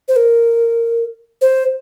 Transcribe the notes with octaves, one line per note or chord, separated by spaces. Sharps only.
C5
A#4
C5